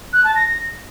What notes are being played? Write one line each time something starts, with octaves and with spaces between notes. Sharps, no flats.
F#6
A5
A#6